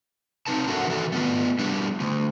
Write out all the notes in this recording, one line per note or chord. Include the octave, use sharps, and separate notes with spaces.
C4 D#4 B4 A5
D4 F#4 A4 A#4 E5 F#5
D#3 E3 F#4 A4
A3 B3 F4 B4
G3 D4 E4 G4
D3 A3